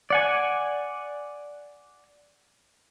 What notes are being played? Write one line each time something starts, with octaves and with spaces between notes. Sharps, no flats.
D5 F#5 G#5